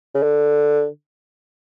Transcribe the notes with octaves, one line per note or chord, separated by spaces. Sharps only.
C#3
D3